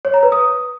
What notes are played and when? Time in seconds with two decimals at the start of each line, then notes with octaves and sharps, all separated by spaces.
0.05 C#5
0.14 A#5
0.23 B4
0.32 D#6